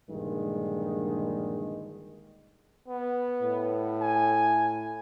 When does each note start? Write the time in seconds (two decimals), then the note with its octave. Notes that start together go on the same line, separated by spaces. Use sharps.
0.10 A#1 G2 D3 D#3 G#3
2.88 B3
3.42 A2
4.01 G#5